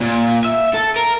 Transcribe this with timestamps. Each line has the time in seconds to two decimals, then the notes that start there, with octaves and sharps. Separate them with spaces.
0.01 A#2
0.45 E5
0.74 A4
0.96 A#4